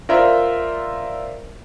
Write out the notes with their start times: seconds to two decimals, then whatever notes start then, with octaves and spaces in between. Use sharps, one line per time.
0.09 F4 A#4 C5 D5 E5